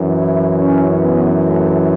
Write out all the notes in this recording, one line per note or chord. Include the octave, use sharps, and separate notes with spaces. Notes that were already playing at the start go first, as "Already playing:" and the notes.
Already playing: F#2 E3
E4
C#4
B3
A3